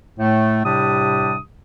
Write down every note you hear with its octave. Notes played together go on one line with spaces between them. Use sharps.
A2 A3
A2 C3 G3 D4 G4 D#6